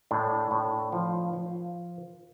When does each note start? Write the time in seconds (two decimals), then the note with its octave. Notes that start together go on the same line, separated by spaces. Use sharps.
0.11 A2 D4
0.51 A2
0.92 F3
1.33 F3